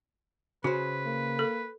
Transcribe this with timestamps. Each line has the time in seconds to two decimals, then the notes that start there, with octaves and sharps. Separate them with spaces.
0.64 C#3 F#4 B4 C5
1.06 A#3
1.39 A4